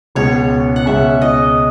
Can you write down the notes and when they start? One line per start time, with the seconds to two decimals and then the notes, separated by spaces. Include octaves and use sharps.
0.15 C#2 B2 G#3 C#4 C#5
0.76 F#5
0.86 C#2 B2 G#3 C#4 E5
1.22 D#5